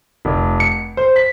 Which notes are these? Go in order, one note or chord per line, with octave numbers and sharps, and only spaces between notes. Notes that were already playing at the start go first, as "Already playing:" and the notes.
F1
C#7
C5
B6